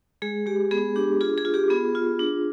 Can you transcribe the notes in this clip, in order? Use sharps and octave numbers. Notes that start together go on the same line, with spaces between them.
G#3 G#4
G#3 G4
B3 G#4
D4 G4
F4 G#4
G#4
F4
G4
B3 G#4
F4
D4